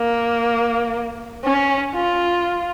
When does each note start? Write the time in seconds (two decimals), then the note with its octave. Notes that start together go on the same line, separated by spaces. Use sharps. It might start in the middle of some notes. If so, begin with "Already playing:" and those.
Already playing: A#3
1.44 C#4
1.95 F4